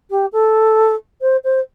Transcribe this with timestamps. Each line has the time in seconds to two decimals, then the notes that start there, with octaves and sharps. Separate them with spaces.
0.10 G4
0.32 A4
1.21 C5
1.44 C5